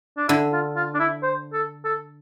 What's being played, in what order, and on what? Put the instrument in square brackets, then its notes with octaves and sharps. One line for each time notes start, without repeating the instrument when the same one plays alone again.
[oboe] D4
[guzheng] D3 [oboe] E4
[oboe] F4
F4
D4
E4
C5
A4
A4